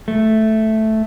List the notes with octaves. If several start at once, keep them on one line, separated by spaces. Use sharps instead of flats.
A3